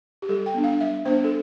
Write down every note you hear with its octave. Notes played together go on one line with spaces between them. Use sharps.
G4
G3 A4
G5
B3 D4
F5
G3 E5
B3 D4 C5
A4